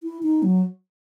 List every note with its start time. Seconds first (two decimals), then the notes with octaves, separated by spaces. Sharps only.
0.03 E4
0.23 D#4
0.43 F#3